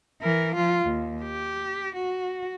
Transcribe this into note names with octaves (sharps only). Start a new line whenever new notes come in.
E3 A#4
F3 F4
D#2
G4
F#4